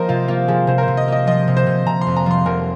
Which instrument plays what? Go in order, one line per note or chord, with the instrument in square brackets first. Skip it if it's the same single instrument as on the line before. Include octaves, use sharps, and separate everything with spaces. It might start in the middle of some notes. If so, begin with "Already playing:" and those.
Already playing: [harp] F3 A#3 [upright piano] A#4 C5 D#5
[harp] C3 [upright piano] F4
[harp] A#3 [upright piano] F4
[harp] F3 [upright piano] G#4
[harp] C3 [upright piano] C5
[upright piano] A#4
C5
[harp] C3
[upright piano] D#5
[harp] A#3 [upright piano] D#5
[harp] F3 [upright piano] D#5
[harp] C3
[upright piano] C5
[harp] C3
[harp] C3 [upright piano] A#5
[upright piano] C6
[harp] F2
[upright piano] A#5
[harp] F3 [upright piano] C6
[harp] F1 [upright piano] A#4